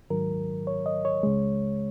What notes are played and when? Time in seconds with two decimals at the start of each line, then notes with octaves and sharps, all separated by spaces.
0.10 G#2 D#3 F#3 A#4
0.67 C#5
0.86 D#5
1.05 C#5
1.23 C#2 C#3 G#3